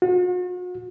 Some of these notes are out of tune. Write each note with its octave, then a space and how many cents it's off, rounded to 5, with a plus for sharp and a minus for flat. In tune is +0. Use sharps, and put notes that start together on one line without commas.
F#4 -45